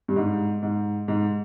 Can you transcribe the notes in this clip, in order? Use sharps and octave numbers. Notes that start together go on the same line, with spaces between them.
G2
G#2
G#2
G#2